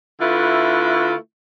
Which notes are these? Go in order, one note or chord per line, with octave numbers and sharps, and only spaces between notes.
D3 A3 E4 F4 B4